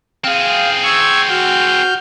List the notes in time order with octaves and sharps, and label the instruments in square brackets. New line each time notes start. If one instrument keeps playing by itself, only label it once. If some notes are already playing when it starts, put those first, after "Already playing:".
[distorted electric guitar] C4 G#4 [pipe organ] F5
[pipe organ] C#6 E6 G#6
F#4 F6 G6